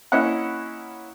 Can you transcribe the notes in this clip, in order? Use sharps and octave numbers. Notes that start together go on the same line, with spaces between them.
A#3 C#4 E4 D#5 F#5